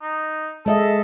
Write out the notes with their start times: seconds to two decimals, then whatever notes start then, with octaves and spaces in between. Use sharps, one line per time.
0.02 D#4
0.66 G#3 A4 D#5 E5